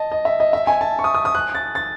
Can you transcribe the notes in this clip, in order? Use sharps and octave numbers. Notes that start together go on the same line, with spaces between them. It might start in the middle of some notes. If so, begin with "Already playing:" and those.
Already playing: D#5 A5
D#5
E5
D#5
E5
G#5
A5
C#6
D#6
D#6
D#6
F#6
A6
A6